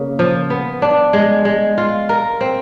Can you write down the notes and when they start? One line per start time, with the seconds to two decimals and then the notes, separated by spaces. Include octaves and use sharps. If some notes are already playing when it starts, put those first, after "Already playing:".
Already playing: C#3 A#3
0.19 F3
0.50 B3
0.82 D4
1.13 G#3
1.45 G#3
1.78 F4
2.09 A#4
2.41 C4